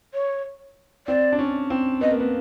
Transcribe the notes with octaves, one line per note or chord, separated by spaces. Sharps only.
C#5
C4 D5
D4
C#4
C4
B3 D#5
A#3
B3